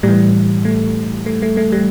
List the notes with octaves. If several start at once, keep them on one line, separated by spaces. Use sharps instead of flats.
A2 E3 G3
A3
A3
A3
A3
G3